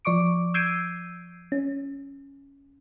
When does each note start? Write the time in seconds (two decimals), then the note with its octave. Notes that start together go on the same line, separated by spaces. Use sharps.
0.05 F3 D5 C#6 D6 D7
0.54 E6 G6 G#6 C7 D7 D#7
1.52 C#4